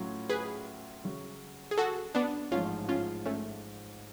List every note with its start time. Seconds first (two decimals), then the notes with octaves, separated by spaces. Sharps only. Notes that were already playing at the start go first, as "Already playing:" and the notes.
Already playing: A2 F#3 C#4 F4
0.30 G#4 B4
1.04 C#3 F#3 C#4 F#4
1.71 G#4
1.78 F#4 A4
2.15 B3 D4
2.51 A1 G#2 F3 C#4 F4
2.88 C#4 F4
3.26 A3 C#4